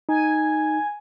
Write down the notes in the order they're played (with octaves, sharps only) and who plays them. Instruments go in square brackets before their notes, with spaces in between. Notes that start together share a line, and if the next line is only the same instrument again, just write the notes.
[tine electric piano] D#4 [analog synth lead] G#5